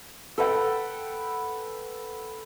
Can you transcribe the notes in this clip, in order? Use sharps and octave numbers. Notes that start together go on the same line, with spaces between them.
A4 B4 F#5 G5